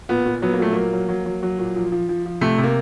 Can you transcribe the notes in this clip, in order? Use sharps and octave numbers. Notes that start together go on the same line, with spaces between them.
A#2 B3
A#2
F#3 B3
A#3
A#2 A3
F#3 A#3
F#3
F#3
F#3
F#3
A#2
F3
F3
F3
F3
C3 A3
C3
A#3